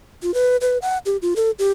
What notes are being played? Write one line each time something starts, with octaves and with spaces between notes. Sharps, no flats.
F4
B4
B4
F#5
G4
F4
A4
G4